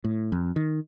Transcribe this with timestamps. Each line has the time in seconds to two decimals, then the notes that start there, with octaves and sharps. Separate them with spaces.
0.04 A2
0.32 F2
0.56 D#3